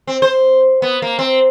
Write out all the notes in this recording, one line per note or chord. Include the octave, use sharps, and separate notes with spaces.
C4
C5
B3
A#3
C4